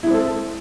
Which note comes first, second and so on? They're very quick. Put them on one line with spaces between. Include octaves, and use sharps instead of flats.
E4 G#3 C4 A4